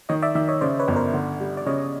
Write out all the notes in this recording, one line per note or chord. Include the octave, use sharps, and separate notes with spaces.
D#3 C#5 D#5
D5 E5
D#3 D5 E5
C#5 D#5
C#3 C5 D5
B4 C#5
G1
A#4 C5
D3
G3
D5
C#3 C#5 D#5